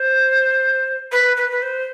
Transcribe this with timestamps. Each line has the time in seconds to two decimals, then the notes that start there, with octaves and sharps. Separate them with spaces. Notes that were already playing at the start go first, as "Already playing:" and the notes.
Already playing: C5
1.11 B4
1.36 B4
1.51 B4
1.62 C5